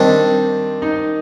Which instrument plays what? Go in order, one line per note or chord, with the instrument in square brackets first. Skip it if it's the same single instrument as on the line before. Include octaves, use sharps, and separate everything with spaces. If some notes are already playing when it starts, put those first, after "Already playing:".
Already playing: [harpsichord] D#3 G3 D4 [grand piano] C4
[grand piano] D#4